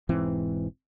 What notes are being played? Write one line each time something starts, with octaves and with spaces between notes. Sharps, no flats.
E1 G#2 E3 C4